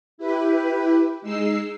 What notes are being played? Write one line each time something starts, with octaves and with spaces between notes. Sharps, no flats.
E4 G4 B4
G#3 D#4 E6 C7